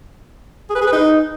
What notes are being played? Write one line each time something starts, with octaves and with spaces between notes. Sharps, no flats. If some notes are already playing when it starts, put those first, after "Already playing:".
G#4
B4
G#4
B4
D#4